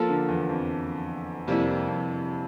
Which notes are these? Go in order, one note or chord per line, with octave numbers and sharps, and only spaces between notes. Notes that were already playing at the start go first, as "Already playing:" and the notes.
Already playing: F3 A#3 F4 A4
D3
E2
F2
F2 C3 G3 A#3 E4
F2